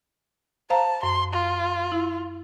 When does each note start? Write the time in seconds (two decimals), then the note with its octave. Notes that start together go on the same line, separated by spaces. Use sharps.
0.70 C5 F5 A5 A#5
1.03 F#2 C6
1.33 F4
1.92 E4